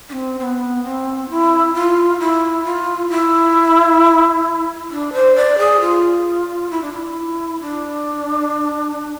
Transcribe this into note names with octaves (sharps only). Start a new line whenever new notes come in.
D4
C4
C4
B3
C4
E4
F4
E4
F4
E4
D4
C5
D5
G#4
F4
E4
D4
F4
E4
D4